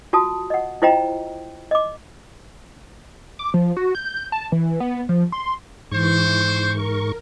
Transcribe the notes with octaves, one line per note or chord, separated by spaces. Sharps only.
F4 F#4 A5 D#6
D#5 F#5
E4 F4 C5 D#5 G5 A#5
D#5 D6
D6
F3
F#4
G6
A5
E3
B3
F3
C6
G#2 E3 C5 C#6
A#4